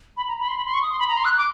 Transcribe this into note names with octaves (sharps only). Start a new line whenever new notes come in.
B5
A#5
B5
C6
B5
C6
C#6
D#6
C6
B5
A#5
C6
F#6
D6